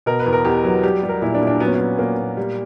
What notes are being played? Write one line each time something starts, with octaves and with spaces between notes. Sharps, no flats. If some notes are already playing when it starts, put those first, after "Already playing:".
B2 A#4
B4
E2
A#4
E2 G4
F#3
G3 G4
G3
A#4
A#2 E4
D4
A#2
D4
F#3 B3
C#4
F#3 B3
A#2 A#3
A#2
G3